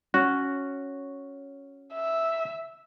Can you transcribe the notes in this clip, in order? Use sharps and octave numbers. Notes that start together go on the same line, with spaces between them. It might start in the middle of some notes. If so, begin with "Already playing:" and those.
C#4 F#4
E5